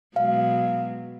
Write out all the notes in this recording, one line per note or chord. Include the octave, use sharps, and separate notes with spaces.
B2 F#3 G#3 F5